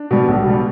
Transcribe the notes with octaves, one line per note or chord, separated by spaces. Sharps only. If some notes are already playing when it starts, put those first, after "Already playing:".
Already playing: D4
B2 G3
B1
B2 G3